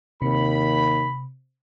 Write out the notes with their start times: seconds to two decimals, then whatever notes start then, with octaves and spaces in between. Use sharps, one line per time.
0.22 D#2 C3 B5